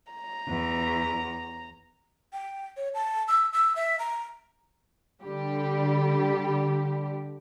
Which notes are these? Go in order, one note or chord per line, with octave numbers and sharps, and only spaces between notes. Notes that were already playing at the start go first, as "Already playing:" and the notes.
A#5
E2
G5
C#5
A5
E6
E6
E5
A#5
D3 G3 G4